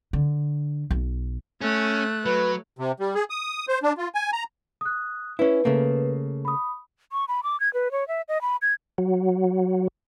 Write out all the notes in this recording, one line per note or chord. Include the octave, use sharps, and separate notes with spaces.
D3
B1
A3 C#4 F#6
F#3 B4
C3
G3
G#4
D#6
C5
D4
F4
G#5
A#5
D#6 F#6
C#4 E4 B4
C#3 A3 A#3
B5 D#6
C#6
B5
D6
G#6
B4
C#5
E5
D#5
B5
G#6
F#3